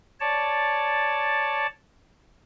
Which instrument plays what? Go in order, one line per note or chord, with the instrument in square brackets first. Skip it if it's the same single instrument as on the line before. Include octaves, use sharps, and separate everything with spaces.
[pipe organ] C#5 D5 A5